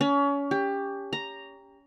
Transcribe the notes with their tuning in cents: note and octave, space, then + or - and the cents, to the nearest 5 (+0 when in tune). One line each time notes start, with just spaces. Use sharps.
C#4 +30
G4 +20
A#5 +0